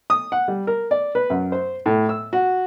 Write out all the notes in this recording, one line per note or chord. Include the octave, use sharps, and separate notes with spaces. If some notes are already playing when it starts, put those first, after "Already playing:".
D#6
F#5
G3
A#4
D5
B4
F#2
C5
A2
E6
F#4